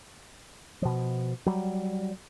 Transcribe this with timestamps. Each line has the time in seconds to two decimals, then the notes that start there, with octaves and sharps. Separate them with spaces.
0.82 B2 F3
1.46 F#3 G3